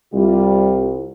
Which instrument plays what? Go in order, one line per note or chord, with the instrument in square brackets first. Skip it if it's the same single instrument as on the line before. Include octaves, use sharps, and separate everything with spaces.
[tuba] C2 [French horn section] C3 G3 F4